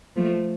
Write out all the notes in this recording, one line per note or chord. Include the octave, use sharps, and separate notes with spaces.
F3 A3